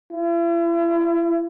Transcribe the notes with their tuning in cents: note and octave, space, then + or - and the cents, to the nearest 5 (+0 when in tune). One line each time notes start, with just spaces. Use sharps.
E4 +40